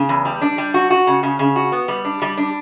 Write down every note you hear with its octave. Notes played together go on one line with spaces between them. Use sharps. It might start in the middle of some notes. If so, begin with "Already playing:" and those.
Already playing: C#3
E2
G3
D4
G3
F#4
F#4
C#3
C#3
C#3
F#4
B3
G3
D4
G3
D4